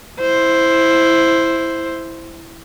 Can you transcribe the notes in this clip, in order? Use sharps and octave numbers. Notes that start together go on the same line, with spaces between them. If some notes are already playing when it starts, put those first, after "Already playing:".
E4 C5